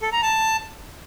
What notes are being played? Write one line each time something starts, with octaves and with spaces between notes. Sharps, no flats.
A4
A#5
A5